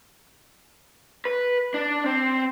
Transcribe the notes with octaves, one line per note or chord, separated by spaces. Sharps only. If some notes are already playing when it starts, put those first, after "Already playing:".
B4
D4
C4